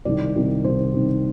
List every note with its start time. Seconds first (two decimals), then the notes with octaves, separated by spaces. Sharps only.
0.05 C2 C3 D#3 D5
0.36 C2 C3 D#3
0.64 C2 C3 D#3 C5
0.93 C2 C3 D#3